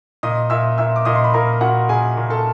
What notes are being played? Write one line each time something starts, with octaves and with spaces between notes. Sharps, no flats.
A#2 D#5 D#6
A#2 E5 E6
A#2 E5 E6
D6
A#2 D#5 D#6
C6
B5
A#2 A#4 A#5
A#2 F#4 F#5
A#2 G#4 G#5
A#2
A4 A5